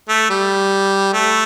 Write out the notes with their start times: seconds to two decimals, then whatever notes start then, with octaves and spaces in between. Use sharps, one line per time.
0.09 A3
0.30 G3
1.13 A3